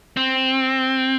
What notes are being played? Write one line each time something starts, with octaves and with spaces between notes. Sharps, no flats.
C4